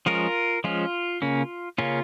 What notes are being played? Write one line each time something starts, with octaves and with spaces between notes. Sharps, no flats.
F3 G#3 C#4 F4 A#4
F3 G#3 C#4 F4
C#3 A#3 C#4
C#3 A#3 C#4 F4